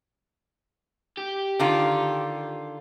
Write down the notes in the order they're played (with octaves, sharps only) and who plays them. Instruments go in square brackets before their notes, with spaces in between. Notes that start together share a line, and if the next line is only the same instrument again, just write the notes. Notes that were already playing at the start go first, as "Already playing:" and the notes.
[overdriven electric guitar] G4
[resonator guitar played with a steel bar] D3 D#3 F4